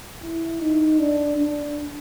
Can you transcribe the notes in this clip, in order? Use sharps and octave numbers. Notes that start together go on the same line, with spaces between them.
E4
D#4
D4
D4